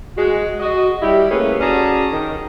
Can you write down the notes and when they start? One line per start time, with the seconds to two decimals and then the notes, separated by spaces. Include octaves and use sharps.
0.17 G#3 F#4
0.60 F#4 D#5
1.02 G3 E4 G4
1.31 A2 A#3 C#4 G#4 A4 B4
1.60 C#4 F#4 G#4 D5 A5 A#5
2.12 D#3